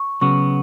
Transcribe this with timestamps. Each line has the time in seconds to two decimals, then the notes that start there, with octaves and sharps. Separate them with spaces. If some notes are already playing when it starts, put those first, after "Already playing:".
Already playing: C#6
0.21 C#3 F#3 B3 F#4 C#6